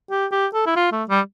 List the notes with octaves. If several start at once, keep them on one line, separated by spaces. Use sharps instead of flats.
G4
G4
A4
E4
F4
A3
G3